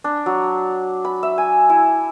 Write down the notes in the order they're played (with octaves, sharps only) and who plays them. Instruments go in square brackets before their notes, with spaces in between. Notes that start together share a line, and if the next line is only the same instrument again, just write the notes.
[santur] D4
F#3
B5
E5
G#5
E4